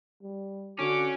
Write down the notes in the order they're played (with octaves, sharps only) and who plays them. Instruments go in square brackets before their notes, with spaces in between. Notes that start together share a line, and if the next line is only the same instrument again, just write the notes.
[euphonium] G3
[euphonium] D3 [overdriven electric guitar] C#4 [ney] F#4 [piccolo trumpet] D6